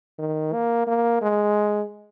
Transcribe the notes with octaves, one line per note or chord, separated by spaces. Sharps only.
D#3
A#3
A#3
G#3